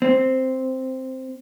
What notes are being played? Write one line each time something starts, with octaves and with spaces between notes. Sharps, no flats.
C4